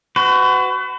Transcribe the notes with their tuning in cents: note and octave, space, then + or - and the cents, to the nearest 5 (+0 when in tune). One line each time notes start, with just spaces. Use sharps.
F#4 +10 B4 +40